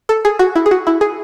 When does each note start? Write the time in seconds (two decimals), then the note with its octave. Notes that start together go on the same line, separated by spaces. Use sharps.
0.09 A4
0.25 G#4
0.39 F#4
0.56 E4
0.66 G#4
0.71 F#4
0.87 E4
1.01 G#4